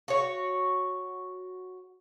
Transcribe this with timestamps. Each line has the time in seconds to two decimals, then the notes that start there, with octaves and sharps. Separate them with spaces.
0.08 F#4 C#5